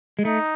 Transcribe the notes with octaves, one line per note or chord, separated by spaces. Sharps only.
G#3
A3 D#4